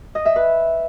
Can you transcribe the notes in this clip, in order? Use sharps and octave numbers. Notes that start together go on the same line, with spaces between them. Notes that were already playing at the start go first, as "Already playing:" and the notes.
D#5
E5
B4